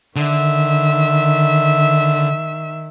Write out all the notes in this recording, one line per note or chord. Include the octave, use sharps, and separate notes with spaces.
D3 D#3 E5